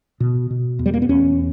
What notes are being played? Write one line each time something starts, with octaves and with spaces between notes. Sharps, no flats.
B2
B2
E2
G3
A#3
B3
E2 C#4